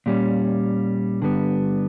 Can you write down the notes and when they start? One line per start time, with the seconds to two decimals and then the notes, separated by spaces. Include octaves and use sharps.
0.06 A#2 G3 C#4
1.21 G2 D3 G3 B3